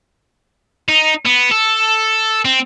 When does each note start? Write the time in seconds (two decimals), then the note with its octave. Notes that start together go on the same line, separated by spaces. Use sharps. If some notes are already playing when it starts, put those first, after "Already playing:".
0.89 D#4
1.25 B3
1.51 A4
2.45 C4